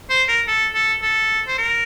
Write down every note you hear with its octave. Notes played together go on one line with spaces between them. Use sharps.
C5
A#4
A4
A4
A4
C5
A#4